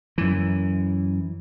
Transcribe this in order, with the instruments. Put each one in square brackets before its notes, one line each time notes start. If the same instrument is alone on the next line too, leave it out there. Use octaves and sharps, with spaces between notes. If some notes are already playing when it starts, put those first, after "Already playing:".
[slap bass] F#2 E3